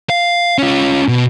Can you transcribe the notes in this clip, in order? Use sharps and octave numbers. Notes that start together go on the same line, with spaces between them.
F5
C#4 F4
B2